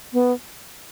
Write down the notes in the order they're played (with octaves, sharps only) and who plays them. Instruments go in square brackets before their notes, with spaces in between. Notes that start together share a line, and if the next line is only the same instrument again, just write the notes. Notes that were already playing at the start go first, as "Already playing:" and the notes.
[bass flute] B3